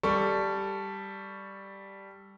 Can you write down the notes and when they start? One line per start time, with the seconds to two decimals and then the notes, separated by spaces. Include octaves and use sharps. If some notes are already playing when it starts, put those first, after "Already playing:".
0.03 G3 A4 C#6